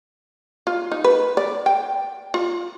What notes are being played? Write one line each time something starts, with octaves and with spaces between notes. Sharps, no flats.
F4
D#4
B4
D5
G5
F4